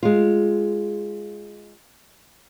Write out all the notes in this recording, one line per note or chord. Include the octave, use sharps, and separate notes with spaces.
G#3 F4